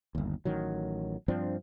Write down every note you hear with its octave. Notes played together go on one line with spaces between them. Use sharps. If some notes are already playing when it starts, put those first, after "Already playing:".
G1 D#2
A1 D#3 F#3
G2 F3 C4 D4